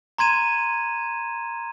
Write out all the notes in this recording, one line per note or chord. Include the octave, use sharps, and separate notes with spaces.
A#5 C6 G#6 D#7 E7